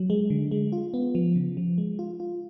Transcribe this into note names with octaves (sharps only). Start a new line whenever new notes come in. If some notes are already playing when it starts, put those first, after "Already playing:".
Already playing: F#3
G#3
D3
G#3
F4
B3
F3
C#3
F3
G#3
F4
F4